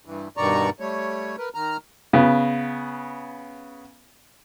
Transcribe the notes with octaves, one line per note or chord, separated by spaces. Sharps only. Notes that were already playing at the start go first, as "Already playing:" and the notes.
G2 E3
G2 B2 D#3 D5 A#5 C#6
G3 A3 C#5
A#4 B4
D#3 A#5 F6
C#3 B3